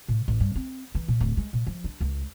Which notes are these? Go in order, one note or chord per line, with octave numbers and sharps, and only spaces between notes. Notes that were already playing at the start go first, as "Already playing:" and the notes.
A2
A1
G2
C4
E3
A#2
D1
G#3
A#2
F3
D4
C#2